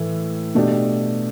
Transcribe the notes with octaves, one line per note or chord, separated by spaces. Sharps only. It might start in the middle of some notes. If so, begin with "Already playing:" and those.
Already playing: A2 E3 A3
B2 A3 D4 G4